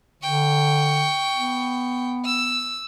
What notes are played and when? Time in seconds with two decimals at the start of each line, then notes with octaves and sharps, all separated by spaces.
0.23 D3 G5 C#6
1.35 B3
2.25 E6